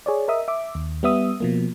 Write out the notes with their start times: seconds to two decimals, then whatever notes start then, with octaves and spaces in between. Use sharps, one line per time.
0.06 G#4 C#5 D5
0.28 A#4 D#5 E5 D#6
0.48 E5 D6
0.75 D#2
1.03 G3 B3 E5 D#6
1.40 B2 F3 A#3